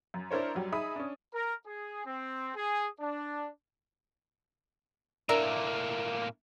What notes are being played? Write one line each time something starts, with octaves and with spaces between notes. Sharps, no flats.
F#2
D4 E4 A#4 C5 C#5
F#2 F#3 G3
D#4 G#4 E5 B5 D#6
C#4 D4
A#4
G#4
C4
G#4
D4
A2 A#3 D4 A#4 E5